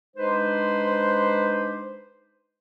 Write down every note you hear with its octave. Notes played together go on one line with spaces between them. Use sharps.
G#3 D4 D#4 B4 C5